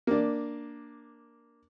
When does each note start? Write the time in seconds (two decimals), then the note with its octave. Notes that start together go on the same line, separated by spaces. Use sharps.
0.07 A#3 D4